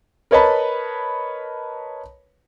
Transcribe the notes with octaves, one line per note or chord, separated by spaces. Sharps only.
A#4 B4 C#5 D#5 A5 B5